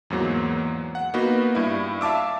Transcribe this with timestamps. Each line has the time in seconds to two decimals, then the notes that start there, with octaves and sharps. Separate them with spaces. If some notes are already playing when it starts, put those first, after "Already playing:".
0.10 E2 G#2 F#3 A#3
0.95 F#5
1.14 A#3 B3 D#4 F#4 B4
1.55 G2 E4
2.01 E5 F5 A5 D6 E6